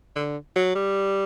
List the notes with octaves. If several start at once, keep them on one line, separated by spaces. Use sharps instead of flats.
D3
F#3
G3